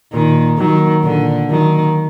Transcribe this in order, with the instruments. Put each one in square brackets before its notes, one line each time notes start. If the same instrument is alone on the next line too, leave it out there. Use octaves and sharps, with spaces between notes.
[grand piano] A#2 [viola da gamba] D#3
[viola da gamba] D#3 [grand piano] F#3 A#3
[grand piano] A#2 [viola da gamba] D3
[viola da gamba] D#3 [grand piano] F#3 A#3